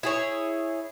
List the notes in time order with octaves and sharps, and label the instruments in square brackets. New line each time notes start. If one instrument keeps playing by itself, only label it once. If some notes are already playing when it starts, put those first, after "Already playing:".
[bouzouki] E4 G#4 C#5